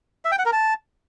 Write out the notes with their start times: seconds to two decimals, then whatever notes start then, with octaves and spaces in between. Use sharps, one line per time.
0.25 E5
0.32 G5
0.39 F#5
0.46 A#4
0.53 A5